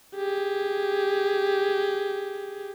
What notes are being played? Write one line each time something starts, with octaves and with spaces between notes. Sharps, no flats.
G4 G#4